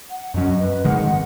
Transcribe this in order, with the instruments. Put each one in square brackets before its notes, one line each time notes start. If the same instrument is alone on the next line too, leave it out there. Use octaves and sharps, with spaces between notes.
[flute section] F#5
[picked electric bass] F#2 F#3 C#4 [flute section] D#5
[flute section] B4
[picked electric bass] G#1 G#2 D#3 G#3 [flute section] F#5
[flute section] F#5